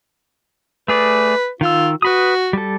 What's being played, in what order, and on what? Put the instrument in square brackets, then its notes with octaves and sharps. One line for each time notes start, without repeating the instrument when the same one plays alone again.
[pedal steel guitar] A3 G#4 D5 [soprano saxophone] B4
[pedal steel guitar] D#3 E6 [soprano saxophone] F4
[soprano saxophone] F#4 [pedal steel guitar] B4 B5 D#6
[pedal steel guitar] G3 A4